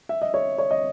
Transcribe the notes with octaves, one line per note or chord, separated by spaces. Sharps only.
E5
D#5
C#5
C#5
D#5